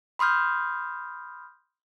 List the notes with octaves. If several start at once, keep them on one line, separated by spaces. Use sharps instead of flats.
B5 C6 D#6 F6 G6